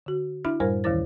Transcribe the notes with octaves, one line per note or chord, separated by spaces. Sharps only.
D3 F#4
D4 E4 E5 B5 F6
F#2 A2 G3 A#4 C5 F6
D#2 D#3 E3 E4 C5 A6